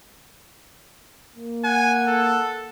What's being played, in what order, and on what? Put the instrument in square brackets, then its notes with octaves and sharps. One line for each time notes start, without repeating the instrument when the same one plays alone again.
[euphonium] A#3
[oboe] F#5 [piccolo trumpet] G#5
[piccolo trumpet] A4